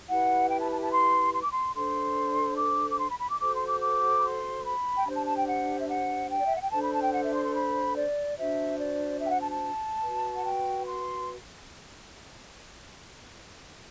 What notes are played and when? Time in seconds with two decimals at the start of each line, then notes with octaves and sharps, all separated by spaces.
0.09 E4 G4 B4 F#5
0.50 G5
0.60 A5
0.72 A5
0.82 A5
0.92 C6
1.33 C6
1.43 D6
1.51 C6
1.74 D4 A4 C5 C6
2.58 D6
2.91 D6
2.99 C6
3.09 B5
3.20 B5
3.30 D6
3.40 F#4 A4 C5 D6
3.54 C6
3.68 D6
3.81 D6
4.18 B5
4.24 C6
4.64 B5
4.97 G5
5.05 D4 G4 C5 A5
5.16 A5
5.27 A5
5.36 G5
5.47 F#5
5.80 E5
5.89 F#5
6.29 G5
6.38 D5
6.47 E5
6.55 F#5
6.63 G5
6.71 D4 A4 C5 A5
6.82 B5
6.92 A5
7.02 G5
7.13 F#5
7.22 E5
7.33 C6
7.44 C6
7.54 B5
7.96 D5
8.37 D4 F#4 C5 E5
8.78 D5
9.20 E5
9.25 G5
9.30 F#5
9.41 A5
9.51 A5
10.03 F#4 B4
10.35 F#5
10.44 G5
10.85 C6